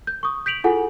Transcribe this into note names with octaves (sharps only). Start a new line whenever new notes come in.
G6
C#6 D#6
G6 B6 D7 F7 F#7
E4 F4 G#4 A4 F#5 G#5